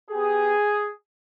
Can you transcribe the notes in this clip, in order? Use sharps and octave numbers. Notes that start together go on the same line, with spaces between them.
B3 G4 G#4